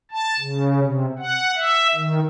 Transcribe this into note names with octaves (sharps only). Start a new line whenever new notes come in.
A5
C#3
C3
F#5
E5
D#3